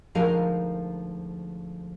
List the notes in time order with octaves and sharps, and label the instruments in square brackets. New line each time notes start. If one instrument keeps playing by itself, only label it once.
[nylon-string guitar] D2 F3 G#3 D#4 A#4 F5